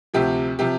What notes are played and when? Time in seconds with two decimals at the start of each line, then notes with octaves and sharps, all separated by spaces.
0.14 D2 C3 F3 G4
0.59 C3 F3 G4